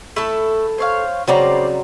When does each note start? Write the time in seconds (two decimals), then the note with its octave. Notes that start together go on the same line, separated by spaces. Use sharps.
0.16 A3 E4 A4
0.78 C5 C#5 F5
1.27 C#3 F#3 G3 C4 C5 D5 A#5